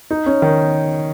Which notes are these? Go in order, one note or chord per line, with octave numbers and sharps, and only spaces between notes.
D#4
C#4
D#3